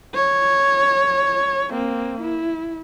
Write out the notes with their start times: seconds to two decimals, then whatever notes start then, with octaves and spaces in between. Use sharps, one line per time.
0.15 C#5
1.70 A#3 C4
2.21 E4